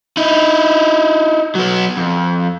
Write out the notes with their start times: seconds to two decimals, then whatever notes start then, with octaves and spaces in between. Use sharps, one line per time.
0.17 D#4 E4
1.55 F#3 B3
1.97 F2